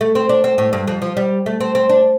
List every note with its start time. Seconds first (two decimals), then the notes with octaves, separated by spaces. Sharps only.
0.01 A3
0.15 C4
0.29 D4
0.44 C4
0.58 A2
0.73 G2
0.88 F2
1.02 F3
1.17 G3
1.46 A3
1.60 C4
1.75 C4
1.89 D4